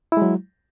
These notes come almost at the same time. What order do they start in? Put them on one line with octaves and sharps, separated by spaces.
E4 G#3 F#3